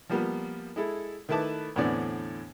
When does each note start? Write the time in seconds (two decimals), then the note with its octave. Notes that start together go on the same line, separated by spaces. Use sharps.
0.09 F3 G3 A#3 B3
0.76 G#3 E4 A4
1.29 D#3 A3 E4 B4 A5 D6
1.76 E2 A2 D3 B3 C4 D5